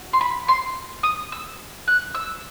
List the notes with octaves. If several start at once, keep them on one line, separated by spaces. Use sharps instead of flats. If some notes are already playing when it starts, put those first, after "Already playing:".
Already playing: F#4
C6
B5
C6
D#6
E6
F#6
E6